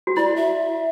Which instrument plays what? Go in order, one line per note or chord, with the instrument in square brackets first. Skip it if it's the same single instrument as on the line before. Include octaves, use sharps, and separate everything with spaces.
[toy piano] F#4
[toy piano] E4 [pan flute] D5
[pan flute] E5